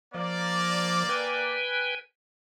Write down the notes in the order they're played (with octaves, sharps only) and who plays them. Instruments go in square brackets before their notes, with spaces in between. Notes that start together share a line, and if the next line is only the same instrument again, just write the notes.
[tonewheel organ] F3 [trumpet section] A#3 D5
[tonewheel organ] B4 G5 G#5